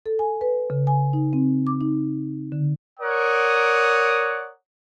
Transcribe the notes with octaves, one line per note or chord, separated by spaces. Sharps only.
A4
G#5
B4
C#3
G#5
D#4
C4
D6
D#4
D3
A#4 C#5 D5 F#5 D#6